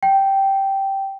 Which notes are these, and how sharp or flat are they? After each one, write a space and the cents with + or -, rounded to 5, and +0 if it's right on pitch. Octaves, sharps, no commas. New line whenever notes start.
G5 -10